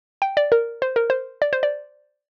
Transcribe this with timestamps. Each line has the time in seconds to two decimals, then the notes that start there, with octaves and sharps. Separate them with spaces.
0.22 G5
0.37 D5
0.52 A#4
0.82 C5
0.96 A#4
1.10 C5
1.42 D5
1.53 C5
1.63 D5